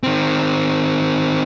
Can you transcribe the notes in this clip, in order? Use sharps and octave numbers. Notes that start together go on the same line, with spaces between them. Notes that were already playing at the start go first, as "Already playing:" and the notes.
D#3 C4